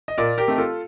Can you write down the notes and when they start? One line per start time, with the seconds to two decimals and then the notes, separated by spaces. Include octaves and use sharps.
0.08 D#5
0.18 A#2 A#4 D5
0.38 G4 A#4
0.48 A3 C4 D#4
0.58 F4 A4